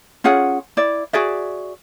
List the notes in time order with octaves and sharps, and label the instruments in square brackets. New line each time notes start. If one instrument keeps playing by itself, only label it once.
[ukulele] C#4 F4 G#4 F#5
E4 D5
F#4 G#4 D5 E5